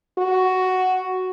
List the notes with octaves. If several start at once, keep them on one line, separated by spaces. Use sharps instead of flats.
F#4